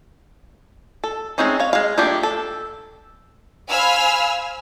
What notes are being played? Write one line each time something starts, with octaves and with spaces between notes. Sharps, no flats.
A4
G#3 A3 C4 C#4 D#4
C#5 F5
G#3 F5
F3 A3 A#3 D4 G4
A4
C5 F5 G#5 B5 E6 F6